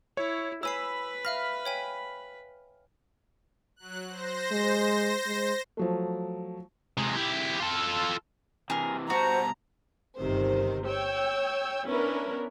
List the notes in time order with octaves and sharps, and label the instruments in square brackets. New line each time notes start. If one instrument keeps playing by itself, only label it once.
[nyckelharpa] E4 [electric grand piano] C#5
[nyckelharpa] B4 B5 [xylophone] C#5 G#5 C7 [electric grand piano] E6
[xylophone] E5 F5 A#6 [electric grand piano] F6
[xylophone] C#5 G5 G#5
[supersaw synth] F#3 F#6
C5 A#6
[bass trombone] G#3
G#3
[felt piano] F3 F#3 A3
[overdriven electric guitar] C3 G#3
E4 G4
F4 A4
[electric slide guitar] C3 E3 [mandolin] G#4 A#4
[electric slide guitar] B2 G3 A5 [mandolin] F#4 [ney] C5 [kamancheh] A#5
[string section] G1 C3 D#3 C5
C#5 G5 E6
B3 C#4 D4 E4 A#4 B4